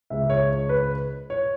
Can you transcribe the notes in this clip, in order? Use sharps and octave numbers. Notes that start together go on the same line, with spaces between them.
C#2 C#3 G#3 E5
C#5
C#5
B4
C#5